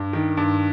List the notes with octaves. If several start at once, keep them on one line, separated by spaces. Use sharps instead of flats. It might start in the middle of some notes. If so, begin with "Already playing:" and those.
Already playing: G2
D#3
G2